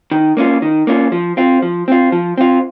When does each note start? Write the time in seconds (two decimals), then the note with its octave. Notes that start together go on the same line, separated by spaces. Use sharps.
0.11 D#3
0.37 A#3 C#4 F4
0.62 D#3
0.87 A#3 C#4 F4
1.12 F3
1.37 C4 F4
1.62 F3
1.88 C4 F4
2.12 F3
2.38 C4 F4